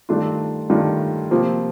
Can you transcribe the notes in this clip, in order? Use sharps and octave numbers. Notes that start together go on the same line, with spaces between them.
G2 D#3 A3 D4 F4
G2 D#3 A3 D4 F4
C3 F3 A#3 F4